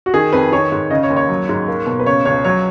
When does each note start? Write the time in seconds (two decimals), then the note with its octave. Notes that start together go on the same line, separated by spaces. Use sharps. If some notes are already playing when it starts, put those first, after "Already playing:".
0.06 F#4
0.14 D#3 G#4
0.33 F2 B4
0.52 D#3 C#5
0.72 G#2
0.90 C#3 D#5
1.03 C#5
1.10 D#2
1.16 C#5
1.29 F#3
1.49 G#2
1.68 A#3
1.86 B2
2.00 B4
2.06 C#3 C#5
2.25 C#2 C#5
2.44 F#3 C#5